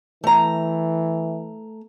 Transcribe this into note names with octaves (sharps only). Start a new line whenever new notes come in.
E3 A3 A#5